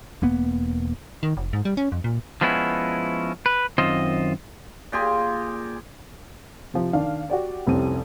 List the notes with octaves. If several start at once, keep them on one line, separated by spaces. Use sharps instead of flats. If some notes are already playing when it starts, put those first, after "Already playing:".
E1 A#3 B3
D#3
F1
G#2
G3
C#4
F2
A#2
F3 G#3 B3 C#4 E4
B4
F#2 D#3 C4 F4 C5 D#5
A#2 G4 G#4 C6
C3 F3
D#3 D4 F5
F#4 G4 D5
F1 C2 C3 C4 C#4 D#7